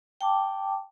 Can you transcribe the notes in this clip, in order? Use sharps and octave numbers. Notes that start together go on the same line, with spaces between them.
G5 A5 D6